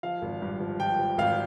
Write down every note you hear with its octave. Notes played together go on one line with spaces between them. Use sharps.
F3 F5
G#1
G2
F3
F3 G5
F3
G#1 F5